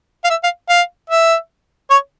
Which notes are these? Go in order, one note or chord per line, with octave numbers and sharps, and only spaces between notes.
F5
E5
F5
F5
E5
C#5